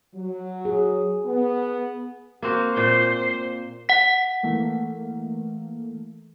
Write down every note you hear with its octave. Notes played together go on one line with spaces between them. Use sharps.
F#3
G#4
B3
A#3 C4 F#4
A#2 C5 G5
F#5 B6
E3 A3 A#3